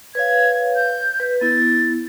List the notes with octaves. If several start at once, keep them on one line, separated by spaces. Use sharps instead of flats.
B4 C#5 F5 G#6
G6
B4
B3 E4 A6